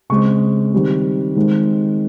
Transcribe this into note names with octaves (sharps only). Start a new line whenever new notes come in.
C#3 G#3 C4 C#6
D#3 G3 C4
D#3 G#3 C4